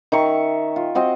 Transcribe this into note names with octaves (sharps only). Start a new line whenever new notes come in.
D#3 E5 C#6
F4
C4 F#4 D#5